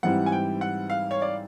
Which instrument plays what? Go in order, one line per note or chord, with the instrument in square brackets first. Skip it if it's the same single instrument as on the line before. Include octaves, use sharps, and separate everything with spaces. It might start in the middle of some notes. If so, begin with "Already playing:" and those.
[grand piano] G#2 E3 G3 C4 E4 [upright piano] F#5
[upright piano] G#5
G5
F#5
F5
C#5
D5